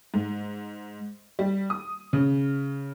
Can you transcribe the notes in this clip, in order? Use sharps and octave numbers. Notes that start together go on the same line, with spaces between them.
G#2
G3
D#6
C#3